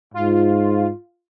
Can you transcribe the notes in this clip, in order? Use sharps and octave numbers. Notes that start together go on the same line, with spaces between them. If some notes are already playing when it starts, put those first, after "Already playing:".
G#2 F4